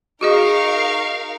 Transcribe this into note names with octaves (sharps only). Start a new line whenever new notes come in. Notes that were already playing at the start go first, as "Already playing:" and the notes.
D#4 F#4 G#4 A#4 D#5 F5 C#6